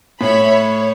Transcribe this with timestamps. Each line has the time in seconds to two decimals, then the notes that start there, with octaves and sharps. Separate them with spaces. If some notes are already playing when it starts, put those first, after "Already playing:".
0.21 A2 C#5 E5 B5
0.51 C#5